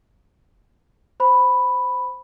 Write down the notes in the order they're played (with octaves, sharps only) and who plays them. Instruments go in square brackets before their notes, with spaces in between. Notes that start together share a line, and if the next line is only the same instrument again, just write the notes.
[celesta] C5 B5